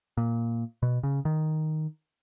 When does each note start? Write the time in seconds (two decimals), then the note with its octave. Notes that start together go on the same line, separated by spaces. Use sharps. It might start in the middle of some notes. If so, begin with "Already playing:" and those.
0.17 A#2
0.83 B2
1.03 C#3
1.25 D#3